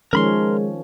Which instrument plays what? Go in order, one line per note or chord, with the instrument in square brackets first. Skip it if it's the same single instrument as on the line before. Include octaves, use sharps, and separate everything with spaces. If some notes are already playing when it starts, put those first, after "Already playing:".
[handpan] D#3 F3 C#4 [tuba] G#3 [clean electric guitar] A#4 B5 C6